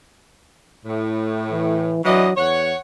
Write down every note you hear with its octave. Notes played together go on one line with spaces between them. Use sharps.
A2
E3
E3 F#3 D4 D#5
E2 C#5 F#5